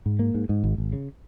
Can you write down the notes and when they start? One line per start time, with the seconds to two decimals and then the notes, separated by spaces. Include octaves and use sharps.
0.06 G#2
0.19 A#3
0.34 G#2
0.49 G#2
0.64 G#1
0.78 G#1
0.93 C#3